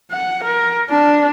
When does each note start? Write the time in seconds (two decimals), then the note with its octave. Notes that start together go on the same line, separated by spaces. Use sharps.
0.11 F#5
0.44 A#4
0.90 D4